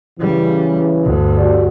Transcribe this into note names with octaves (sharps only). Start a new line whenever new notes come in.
C#3 E3 G3
D2 G2
F#4 G4 D5